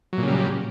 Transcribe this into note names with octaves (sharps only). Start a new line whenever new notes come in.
A#2 C#3 F#3 G3